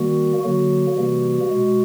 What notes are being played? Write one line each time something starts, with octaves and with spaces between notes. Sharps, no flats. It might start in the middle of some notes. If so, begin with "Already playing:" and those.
Already playing: D#3 G3 A#3 F#4
D3 F#3 A#3 F#4
C3 E3 G3 A#3
B2 G#3